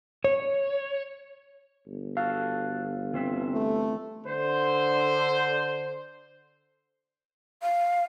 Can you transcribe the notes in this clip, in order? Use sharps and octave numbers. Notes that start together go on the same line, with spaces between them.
C#5
G1
F#4 A4 F5
E3 C4 E5
A3
D3 C5
F5